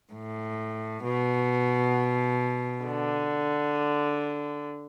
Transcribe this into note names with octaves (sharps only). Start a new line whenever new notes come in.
A2
B2
D3